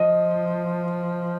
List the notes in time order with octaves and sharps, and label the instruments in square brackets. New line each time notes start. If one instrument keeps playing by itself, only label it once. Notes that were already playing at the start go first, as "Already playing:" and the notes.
Already playing: [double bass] F3 [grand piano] D#5